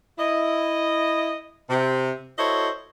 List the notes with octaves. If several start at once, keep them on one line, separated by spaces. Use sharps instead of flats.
E4 D#5
C3
E4 F#4 A4 C5 C#5 D#5